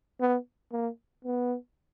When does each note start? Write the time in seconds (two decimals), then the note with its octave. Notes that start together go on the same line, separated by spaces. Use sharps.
0.20 B3
0.72 A#3
1.25 B3